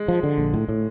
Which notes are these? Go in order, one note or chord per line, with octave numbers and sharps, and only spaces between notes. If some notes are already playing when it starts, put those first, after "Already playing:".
Already playing: G#3
F3
D3
A#1
A2
A2